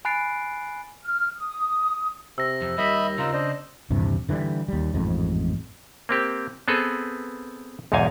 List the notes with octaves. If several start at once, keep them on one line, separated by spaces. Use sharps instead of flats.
G#5 B5 F#6 A6 C7 D7
F6
D#6
C3 E6 A#6
F2
D#2 G3 D#5 E5 B5
C#3 C4 D#4 F4
D4 C5 D#5
D#1 G2 C3 E3
D3 E3 F3 G3
D#2 G3
A1 F2 G#2
A#3 C4 G4
B3 C4 G#4 A4 B4
B1 E2 G#2 D#4 F5 G#5